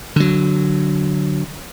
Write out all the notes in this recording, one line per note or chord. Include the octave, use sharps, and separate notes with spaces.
D3 F#3